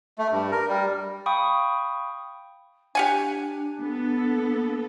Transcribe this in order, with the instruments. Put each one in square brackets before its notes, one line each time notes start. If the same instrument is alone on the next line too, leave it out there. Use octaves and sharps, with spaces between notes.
[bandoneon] A3
G2
A#4
G3
[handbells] F5 G5 B5 C#6 D#6
[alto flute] D4 [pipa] G4 F#5 G#5
[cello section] B3 A4